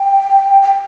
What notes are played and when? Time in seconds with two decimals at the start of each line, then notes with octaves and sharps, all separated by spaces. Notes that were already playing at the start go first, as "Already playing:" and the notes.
Already playing: G5
0.62 G5